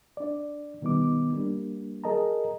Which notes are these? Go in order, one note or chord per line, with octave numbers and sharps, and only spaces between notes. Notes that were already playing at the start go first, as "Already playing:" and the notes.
D4 D5
B2 D#3 G3 B3 D#4 D6
G3 A#3 D4
G#4 A#4 D#5 A5 A#5